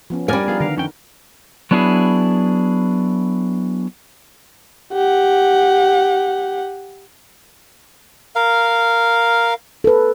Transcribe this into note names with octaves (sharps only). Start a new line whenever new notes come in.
F3 B3 C#4
F2 G3 D4 A#4 D5 G#5
B3 D#4 F4 G#4 A#4 B4
D3 D#3 A#4 F5
F2 C#4 G5
F#3 B3 D4 E4 F4 G#4
G4 F#5
A#4 F5
A4 B4